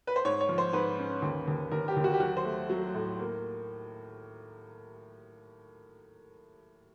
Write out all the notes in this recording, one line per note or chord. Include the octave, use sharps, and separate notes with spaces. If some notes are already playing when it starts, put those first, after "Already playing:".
B4
C5
G#2 C#5
C#5
F3
C5
G#2 B4
C#4
D#2
D#2
D#2 A#4
G4
D#2
F#4
G4
F#3 F#4
C5
A3
F#3
A2
A#3